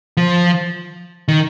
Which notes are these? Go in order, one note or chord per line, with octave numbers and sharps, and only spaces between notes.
F3
D#3